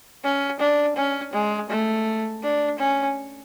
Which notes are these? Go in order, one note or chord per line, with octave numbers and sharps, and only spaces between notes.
C#4
D4
C#4
G#3
A3
D4
C#4